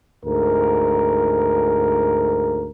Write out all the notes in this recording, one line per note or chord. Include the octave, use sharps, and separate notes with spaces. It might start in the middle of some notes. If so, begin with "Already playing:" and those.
D2 G#2 A#4